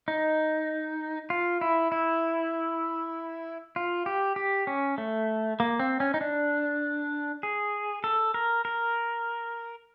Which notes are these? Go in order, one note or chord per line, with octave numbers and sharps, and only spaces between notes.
D#4
F4
E4
E4
F4
G4
G4
C#4
A3
A#3
C4
C#4
D#4
D4
G#4
A4
A#4
A#4